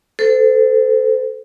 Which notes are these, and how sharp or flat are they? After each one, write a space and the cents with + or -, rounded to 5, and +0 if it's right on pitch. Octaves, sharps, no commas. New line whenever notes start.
A4 +0 C5 -30